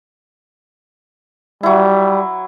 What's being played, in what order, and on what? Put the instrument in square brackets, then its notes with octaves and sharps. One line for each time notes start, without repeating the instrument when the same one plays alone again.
[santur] F#3 E4 [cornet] G3